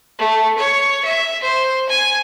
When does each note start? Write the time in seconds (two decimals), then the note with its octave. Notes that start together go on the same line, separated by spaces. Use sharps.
0.19 A3
0.58 C#5
1.04 E5
1.42 C5
1.89 G#5